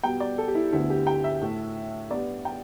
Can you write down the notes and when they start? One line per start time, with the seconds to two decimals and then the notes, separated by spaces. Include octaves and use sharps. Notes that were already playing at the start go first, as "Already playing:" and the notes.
0.03 B2 G3 B3 G5
0.20 D5
0.38 A4
0.48 G4
0.55 E4
0.73 D2 D3 B3 E4
0.90 G4
1.07 G5
1.24 E5
1.42 A2 A3
2.10 G2 G3 B3 D5
2.45 G5